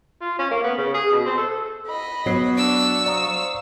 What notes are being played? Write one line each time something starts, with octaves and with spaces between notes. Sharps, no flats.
F4
C#4
A#3
B3
C#3
G#4
B2
C4
A4
A4
D#5 B5
F#3 B3 C7
D4 C#6 E6
C5 D5 F5 A#5 D#6